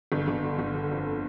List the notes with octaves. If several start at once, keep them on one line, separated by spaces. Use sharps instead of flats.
G1
G1
D3
G1
D3
F2